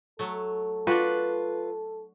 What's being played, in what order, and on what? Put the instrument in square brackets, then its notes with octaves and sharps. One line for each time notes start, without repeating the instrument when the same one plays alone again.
[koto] F#3 A3 [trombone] A4
[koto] D4 F#4 [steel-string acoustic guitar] F4 [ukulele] B4